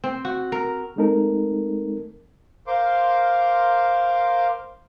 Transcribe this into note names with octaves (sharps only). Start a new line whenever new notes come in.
C4
F#4
A#4
G#3 A3 C4 D#4 A4 A#4
A#4 C5 F5 C6 D6